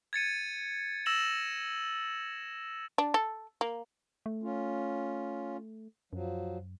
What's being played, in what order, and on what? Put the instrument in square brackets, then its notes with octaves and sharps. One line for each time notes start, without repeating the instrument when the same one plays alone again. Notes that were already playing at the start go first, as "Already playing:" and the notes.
[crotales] G#6 A6 C#7 D#7
E6 A#6 E7 F#7
[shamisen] D4
A4
A#3
[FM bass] A3
[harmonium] C#4 F4
[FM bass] F#2 [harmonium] F3 F#3